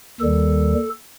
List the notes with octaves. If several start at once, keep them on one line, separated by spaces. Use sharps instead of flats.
D#2 D#3 G3 A4